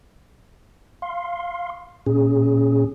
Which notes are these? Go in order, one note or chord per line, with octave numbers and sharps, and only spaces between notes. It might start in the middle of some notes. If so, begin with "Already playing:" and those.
F5 C6
A#2 C#4 G#4